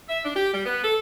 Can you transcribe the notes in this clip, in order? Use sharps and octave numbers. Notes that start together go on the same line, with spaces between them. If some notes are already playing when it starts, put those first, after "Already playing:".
E5
D4
G4
G3
B3
A4